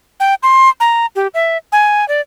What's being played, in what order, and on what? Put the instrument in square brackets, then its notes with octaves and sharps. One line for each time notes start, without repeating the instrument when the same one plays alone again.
[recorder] G5
C6
A#5
G4
E5
G#5
D5